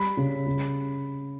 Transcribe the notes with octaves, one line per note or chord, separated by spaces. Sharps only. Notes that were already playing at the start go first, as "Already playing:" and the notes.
Already playing: G3 B5
C#3
C#3